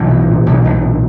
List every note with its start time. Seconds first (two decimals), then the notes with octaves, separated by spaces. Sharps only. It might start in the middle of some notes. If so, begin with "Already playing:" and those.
Already playing: B1 E3
0.10 B2
0.28 A#2
0.46 B1
0.64 B1
0.82 A#2